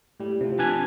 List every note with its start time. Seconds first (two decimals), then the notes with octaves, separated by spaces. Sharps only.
0.20 A2 G3
0.41 C3 F3
0.59 D4 B4 G#5